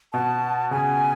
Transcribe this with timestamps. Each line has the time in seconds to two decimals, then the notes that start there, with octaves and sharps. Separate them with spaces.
0.13 B2 A5
0.71 C#3 G#5